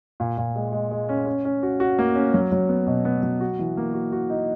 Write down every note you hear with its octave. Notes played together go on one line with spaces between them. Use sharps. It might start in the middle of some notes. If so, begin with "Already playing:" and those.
A#2
A#2
G#3
G#3
G#3
C#4
C#4
C#4
F#4
F#4
A#3
C#4
F#3
F#3
B3
B2
B3
F#3
F#4
E3
A#3
F#4
F#4
D#4